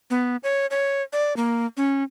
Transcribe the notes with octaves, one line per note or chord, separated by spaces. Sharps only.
B3
C#5
C#5
D5
A#3
C#4